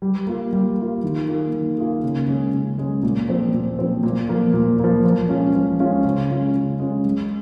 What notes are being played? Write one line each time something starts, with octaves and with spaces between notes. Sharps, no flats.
G3
A#3 F4
G3
A#3 F4
D#3
A#3 F4 G#4
D#3
A#3 F4 G#4
C#3
G#3 C#4 G#4
C#3
G#3 C#4 G#4
A#2
F3 C4
A#2
F3 C4
A#2
F3 A#3
A#2
F3 A#3
F3
G#3 C#4 F4
F3
G#3 C#4 F4
C#3
G#3 C#4 F4
C#3
G#3 C#4 F4
G#3